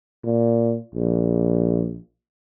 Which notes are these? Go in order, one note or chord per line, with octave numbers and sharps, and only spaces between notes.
A#2
A#1